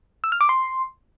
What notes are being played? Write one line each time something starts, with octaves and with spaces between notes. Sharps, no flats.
E6
F6
D6
C6